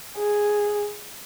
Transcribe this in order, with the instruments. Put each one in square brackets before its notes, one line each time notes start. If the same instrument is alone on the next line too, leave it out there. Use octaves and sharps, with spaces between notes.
[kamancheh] G#4